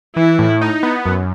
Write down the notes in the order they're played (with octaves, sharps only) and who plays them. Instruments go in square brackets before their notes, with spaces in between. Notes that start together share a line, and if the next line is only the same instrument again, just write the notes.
[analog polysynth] E3 [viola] E4
[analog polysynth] A2
D#4
B3
F#2